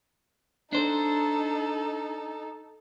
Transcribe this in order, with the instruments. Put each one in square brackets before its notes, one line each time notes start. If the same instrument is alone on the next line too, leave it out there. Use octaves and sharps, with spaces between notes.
[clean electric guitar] D4 C5 [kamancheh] D#4 A4